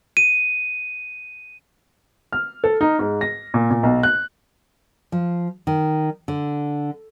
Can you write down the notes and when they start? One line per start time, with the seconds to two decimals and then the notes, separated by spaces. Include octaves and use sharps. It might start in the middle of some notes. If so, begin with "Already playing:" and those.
0.17 D#7
2.32 F6
2.64 A4
2.81 D#4
2.99 G#2
3.21 A#6
3.54 A#2
3.71 A#2
3.83 B1
4.03 F#6
5.12 F3
5.67 D#3
6.28 D3